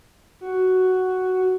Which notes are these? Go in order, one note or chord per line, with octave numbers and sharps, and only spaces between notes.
F#4